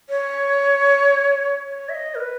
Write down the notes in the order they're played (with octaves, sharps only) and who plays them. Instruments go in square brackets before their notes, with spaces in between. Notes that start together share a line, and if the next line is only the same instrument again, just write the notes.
[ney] C#5
C#5
E5
D#5
A#4
B4